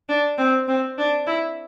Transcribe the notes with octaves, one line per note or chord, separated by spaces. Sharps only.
D4
C4
C4
D4
E4